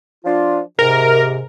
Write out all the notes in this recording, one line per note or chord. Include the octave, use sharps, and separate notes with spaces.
F3 D4 F4
G#2 C3 A#4